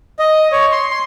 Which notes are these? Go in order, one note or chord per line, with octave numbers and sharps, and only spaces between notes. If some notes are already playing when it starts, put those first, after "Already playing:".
D#5
C#5
C6
C6